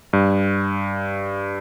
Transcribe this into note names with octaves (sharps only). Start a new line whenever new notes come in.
G2